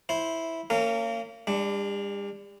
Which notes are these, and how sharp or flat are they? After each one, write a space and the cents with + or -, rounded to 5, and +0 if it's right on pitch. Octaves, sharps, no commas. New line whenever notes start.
E4 -5 C5 +0
A#3 -30 C#4 +0 A#4 -35
G3 +45 D4 +0